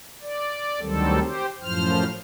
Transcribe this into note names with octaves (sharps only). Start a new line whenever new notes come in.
D5
D2 D#3 F#3 G3 C4 A4
G4 C5
F#2 A2 F3 C5 F6